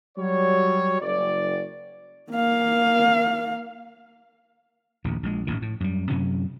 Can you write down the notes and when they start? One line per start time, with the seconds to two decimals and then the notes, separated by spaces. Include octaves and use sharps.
0.17 F#3 G3 C#5
1.00 F#1 D5
2.31 A#3 F5
5.04 D#1 A#1 E2
5.23 A#1 G#3
5.47 A1 A2 D#3
5.62 A2
5.80 F#2 G3
6.10 F#2 C3 F#3 C#4